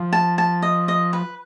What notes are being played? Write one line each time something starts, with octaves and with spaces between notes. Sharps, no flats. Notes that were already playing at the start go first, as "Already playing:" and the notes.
Already playing: F3
A5
A5
D#5
D#5
B4